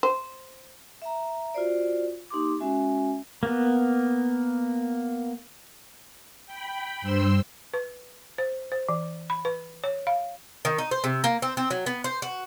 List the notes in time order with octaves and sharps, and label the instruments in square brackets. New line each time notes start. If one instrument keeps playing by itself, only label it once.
[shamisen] C5
[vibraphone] E5 A#5
F4 F#4 C5 D5
A#3 D#4 G4 C6 D6
G#3 C#4 F#4 E5 G#5
[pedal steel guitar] A#3 B3
[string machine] G5 B5
G2 C5 C6 E6
[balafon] B4
C5
C5
E3
B5
B4
C#5
F5
[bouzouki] D#3
D#4
C5
C3
A#3
C4
C4
F#3
B3
C5
F#4